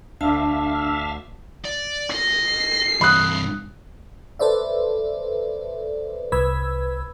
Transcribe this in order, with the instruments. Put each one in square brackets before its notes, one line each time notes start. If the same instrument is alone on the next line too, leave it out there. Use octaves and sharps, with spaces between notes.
[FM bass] D2 [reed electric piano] D4 [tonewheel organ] E5 F5 [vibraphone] A5 D6
[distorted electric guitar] D5
[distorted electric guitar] D#5 [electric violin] C7
[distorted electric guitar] G2 E3 [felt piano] B5 D#6 F#6
[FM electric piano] A4 B4 C5 D5 E5
C2 B4 B5 E6 G#6